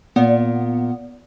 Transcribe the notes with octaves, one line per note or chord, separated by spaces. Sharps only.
A#2 B3